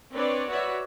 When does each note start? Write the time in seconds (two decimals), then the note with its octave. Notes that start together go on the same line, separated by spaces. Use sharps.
0.13 C4 D4 B4 C#5 D5
0.49 F#4 B4 C#5 D5 E5